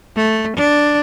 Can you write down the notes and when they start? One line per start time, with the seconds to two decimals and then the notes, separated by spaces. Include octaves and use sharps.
0.16 A3
0.57 D4